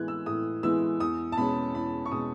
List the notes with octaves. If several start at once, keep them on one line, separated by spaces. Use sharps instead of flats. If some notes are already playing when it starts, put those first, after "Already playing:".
Already playing: A2 E3 G#3 B3 E4 F#6 G#6
E6
A2 D#6
E3 G#3 B3 E4 E6
E2 D#6
A5
B2 G#3 C#4 B5
E2 B5
C#6
B2 G#3 C#4 D#6